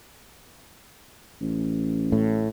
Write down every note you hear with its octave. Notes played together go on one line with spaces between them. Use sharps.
A1
A2